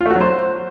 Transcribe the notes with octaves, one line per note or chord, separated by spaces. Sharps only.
F4
A3
F#4
F#3
C5